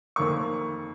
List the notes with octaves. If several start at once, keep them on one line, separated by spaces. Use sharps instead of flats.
F2 D#3 A#3 C#6